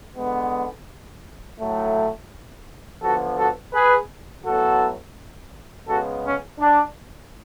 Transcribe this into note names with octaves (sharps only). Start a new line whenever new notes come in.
D3 G#3 B3
A2 F#3 A3
D3 F3 B3 F#4 A4
F#4 A4
G#4 B4
A2 F#3 B3 F#4 A4
C#3 G#3 B3 F#4 A4
C#4
D4